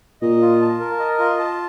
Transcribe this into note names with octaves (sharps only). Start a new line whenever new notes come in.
A#2 D#5
F4
A5
A#4
D#5
F4
A5